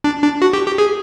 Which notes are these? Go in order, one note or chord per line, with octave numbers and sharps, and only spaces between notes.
D4
D4
F#4
G4
G4
G#4